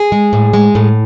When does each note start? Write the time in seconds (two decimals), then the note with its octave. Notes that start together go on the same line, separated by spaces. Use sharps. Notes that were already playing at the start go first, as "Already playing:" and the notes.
Already playing: G#4
0.12 G#3
0.33 A2
0.54 G#3
0.75 A2